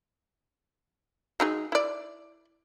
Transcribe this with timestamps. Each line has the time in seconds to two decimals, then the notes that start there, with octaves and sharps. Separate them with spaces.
1.40 F#3 D#4 G#4
1.72 E4 D5